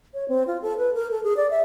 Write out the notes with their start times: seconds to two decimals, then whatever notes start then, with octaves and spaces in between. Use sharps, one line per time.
0.14 C#5
0.29 C4
0.47 F4
0.62 A4
0.78 B4
0.94 A#4
1.11 A4
1.24 G#4
1.37 D5
1.51 E5